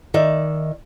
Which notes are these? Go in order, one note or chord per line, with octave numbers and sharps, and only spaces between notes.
D#3 D5 E5